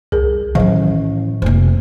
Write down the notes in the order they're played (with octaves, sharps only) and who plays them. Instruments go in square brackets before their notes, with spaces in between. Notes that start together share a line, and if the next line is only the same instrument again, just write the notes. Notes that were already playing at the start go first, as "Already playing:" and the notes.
[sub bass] C2 [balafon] G#4 A#4
[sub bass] A2 [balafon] D#3 F#3 F5 [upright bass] E3 C#4
[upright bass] F1 C3 [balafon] A#3 C5